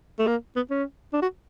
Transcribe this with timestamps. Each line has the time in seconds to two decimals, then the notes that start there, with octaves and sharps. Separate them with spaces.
0.19 A3
0.27 A#3
0.56 B3
0.71 C#4
1.13 D4
1.22 F#4